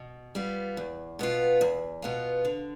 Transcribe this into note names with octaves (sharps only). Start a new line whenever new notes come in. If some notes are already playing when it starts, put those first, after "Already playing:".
Already playing: B2
G3 B3 F4
E2
B2 B3 F4
E2
B2 B3 F4
D3